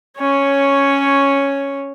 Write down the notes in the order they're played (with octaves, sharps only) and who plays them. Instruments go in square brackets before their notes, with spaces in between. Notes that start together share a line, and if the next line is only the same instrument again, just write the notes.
[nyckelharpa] C#4 C#5